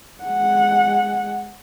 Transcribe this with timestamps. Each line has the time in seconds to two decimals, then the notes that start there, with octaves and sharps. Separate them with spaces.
0.23 G#3 F#5